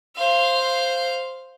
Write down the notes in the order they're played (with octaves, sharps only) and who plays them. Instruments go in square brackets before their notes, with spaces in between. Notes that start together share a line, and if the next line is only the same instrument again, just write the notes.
[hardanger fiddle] C5 F5